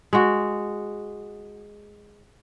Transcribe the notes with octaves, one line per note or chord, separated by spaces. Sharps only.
G#3 F#4